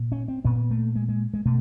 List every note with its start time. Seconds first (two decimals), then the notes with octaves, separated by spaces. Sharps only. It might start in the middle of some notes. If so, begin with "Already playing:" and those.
Already playing: A#2
0.12 C#4
0.28 C4
0.45 A#2 B3
0.71 A3
0.96 G#3
1.09 G#3
1.34 G#3
1.45 B2 A3